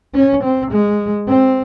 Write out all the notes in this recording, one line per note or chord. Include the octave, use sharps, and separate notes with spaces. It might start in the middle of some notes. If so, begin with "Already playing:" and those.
C#4
C4
G#3
C4